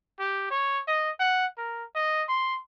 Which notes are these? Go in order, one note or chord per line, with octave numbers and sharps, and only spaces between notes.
G4
C#5
D#5
F#5
A#4
D#5
C6